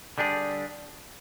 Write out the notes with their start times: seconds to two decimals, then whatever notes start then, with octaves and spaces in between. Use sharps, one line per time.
0.18 D3 G3 D4 G#4